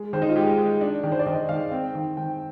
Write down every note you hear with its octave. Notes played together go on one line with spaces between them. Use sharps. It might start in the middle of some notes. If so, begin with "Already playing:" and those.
Already playing: G#3
D#3 C5
D#4
F4
G#3 G4
G#3
D4
D#3
C5
D5
D#3 D#5
D#3 F5
C4
D#3
D#3 G5